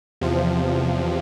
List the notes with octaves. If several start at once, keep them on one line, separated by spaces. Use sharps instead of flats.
E2 C3 F3